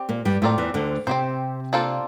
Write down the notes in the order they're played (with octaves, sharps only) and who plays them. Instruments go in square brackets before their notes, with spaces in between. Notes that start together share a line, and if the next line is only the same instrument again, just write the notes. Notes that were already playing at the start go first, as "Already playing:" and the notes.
Already playing: [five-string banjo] C4 G4 D5
[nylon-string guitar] A#2 A#3
G2 G3
[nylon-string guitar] A2 A3 [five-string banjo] F3 C4 F4 A#4 D5
[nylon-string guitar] E2 E3
D2 D3
[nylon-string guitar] C3 [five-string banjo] C4 G4 C5
[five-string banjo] A#3 D4 F4 A4 C5